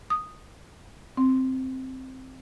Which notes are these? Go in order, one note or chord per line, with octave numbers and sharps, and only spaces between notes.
D#6
C4